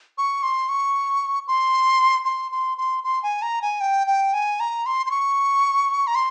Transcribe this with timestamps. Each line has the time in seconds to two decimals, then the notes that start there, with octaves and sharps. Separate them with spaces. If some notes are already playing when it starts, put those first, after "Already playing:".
0.18 C#6
0.43 C6
0.69 C#6
1.47 C6
2.25 C6
2.52 C6
2.78 C6
3.04 C6
3.23 G#5
3.42 A#5
3.62 G#5
3.81 G5
4.07 G5
4.34 G#5
4.60 A#5
4.86 C6
5.06 C6
5.11 C#6
6.07 A#5
6.15 C6